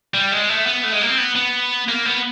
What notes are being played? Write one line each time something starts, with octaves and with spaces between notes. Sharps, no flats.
G3
G#3
A3
B3
A3
G#3
A#3
C4
B3
B3
A#3
B3